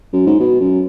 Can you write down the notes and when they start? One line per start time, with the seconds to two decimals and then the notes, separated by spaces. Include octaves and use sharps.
0.13 F#2
0.26 G#2
0.40 B2
0.60 F#2